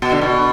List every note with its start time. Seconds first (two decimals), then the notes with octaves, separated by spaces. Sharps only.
0.02 B2
0.12 D3
0.21 B2